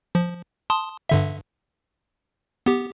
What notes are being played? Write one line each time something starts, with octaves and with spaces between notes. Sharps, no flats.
F3
A5 C6 D#6
G2 D3 E5
B3 G4